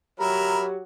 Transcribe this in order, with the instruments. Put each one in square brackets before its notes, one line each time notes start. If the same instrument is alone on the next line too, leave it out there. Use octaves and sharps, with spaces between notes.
[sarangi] F#3 [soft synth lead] G4 [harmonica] A#4 E5 B5 [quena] A#5